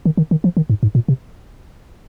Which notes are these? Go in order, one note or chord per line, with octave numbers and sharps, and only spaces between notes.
D#3
D#3
D#3
F3
D#3
G#2
G#2
A#2
C3